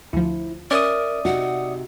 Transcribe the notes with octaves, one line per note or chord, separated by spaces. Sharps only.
D2 F3 E4
C#4 A#4 D5 E5 D#6
C3 D#4 F#4 F#5